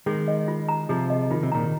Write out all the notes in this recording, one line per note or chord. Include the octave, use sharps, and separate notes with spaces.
D#3 G#3 G#4
D#5
F4
A#5
C3 F3 G#4
D#5
D#3 F4
C3
A#2 D#3 A#5